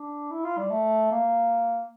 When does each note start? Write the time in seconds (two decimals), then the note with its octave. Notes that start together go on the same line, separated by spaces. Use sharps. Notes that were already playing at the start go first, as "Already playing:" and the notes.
Already playing: D4
0.31 E4
0.44 F4
0.57 G3
0.71 A3
1.12 A#3